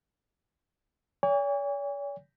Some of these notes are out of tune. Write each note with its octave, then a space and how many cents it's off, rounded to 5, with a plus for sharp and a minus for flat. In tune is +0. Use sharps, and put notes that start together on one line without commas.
C#5 +45 G#5 -40